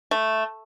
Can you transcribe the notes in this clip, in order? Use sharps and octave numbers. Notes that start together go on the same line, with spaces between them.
A3